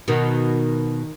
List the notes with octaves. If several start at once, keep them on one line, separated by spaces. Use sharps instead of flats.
B2 D#3